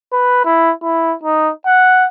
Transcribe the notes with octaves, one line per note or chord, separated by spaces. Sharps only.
B4
E4
E4
D#4
F#5